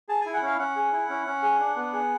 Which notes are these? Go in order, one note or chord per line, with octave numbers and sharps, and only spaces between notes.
G#4 A5
E4 G#5
F#5
C#4 F5
C#4 F#5
G#4
E4
C#4
C#4
G#4
D4
B3
G#4